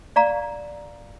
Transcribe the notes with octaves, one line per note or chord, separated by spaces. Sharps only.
D5 F5 A#5